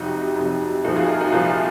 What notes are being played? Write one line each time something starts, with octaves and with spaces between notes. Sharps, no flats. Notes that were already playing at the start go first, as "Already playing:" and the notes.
Already playing: F2 C3 F#3 D#4 F#4
F2 C3 F#3
C2 A#2 F3 D#4 F#4
F4 G#4
F#4 A#4
D#4 F#4
C2 A#2 F3 F4